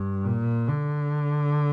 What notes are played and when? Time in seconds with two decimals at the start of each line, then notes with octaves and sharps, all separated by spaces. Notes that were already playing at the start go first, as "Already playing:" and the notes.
Already playing: G2
0.25 A#2
0.68 D3